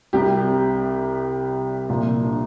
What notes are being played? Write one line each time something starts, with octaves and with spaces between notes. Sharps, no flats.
C2 C3 G3 G4
C2 A#2 F3 F4
D4